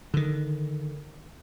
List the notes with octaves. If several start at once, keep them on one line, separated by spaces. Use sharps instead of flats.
D3 D#3